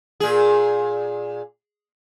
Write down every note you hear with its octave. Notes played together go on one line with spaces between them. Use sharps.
A#2 G#4